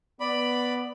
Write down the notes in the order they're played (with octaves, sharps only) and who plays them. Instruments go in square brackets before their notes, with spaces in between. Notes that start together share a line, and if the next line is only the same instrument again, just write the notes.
[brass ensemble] B3 [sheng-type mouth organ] D5 B5